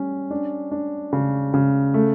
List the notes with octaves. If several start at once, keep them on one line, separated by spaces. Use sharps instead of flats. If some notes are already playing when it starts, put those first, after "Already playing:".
Already playing: G3 C#4
D4
D4
C#3
C#3
A3